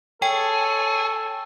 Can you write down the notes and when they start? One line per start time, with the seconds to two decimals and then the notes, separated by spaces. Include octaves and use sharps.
0.22 G#4 A4 C#5 G5